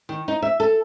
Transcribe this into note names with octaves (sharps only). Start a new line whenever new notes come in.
D#3
D#4
E5
A4